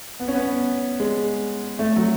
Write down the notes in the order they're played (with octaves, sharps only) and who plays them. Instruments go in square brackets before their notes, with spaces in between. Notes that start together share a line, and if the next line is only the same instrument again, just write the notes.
[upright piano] B3
C#4
B3
G#3
A3
F#3